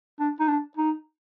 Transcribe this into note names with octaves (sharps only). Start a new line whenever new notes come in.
D4
D#4
D4
D#4